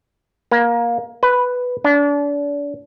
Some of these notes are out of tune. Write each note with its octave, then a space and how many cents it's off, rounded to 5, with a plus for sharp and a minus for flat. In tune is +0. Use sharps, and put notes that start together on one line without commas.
A#3 +20
B4 +5
D4 -35